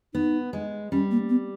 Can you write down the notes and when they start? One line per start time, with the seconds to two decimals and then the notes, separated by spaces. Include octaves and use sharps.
0.14 B3 D#4
0.53 G#3
0.91 G3 C#4
1.11 A#3
1.29 B3